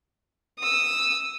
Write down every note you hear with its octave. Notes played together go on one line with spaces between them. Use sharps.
D#6 E6